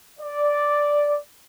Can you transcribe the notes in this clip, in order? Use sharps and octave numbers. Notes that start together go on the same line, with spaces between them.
D5